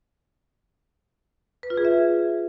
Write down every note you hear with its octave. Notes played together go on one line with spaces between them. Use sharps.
B4
F4
G#4
E5